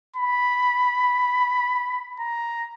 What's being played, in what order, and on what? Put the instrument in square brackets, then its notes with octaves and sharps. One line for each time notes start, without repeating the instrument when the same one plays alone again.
[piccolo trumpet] B5
A#5